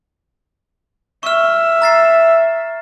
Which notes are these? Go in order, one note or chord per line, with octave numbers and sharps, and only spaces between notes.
E5 C#6 F6
A#5 A6 C7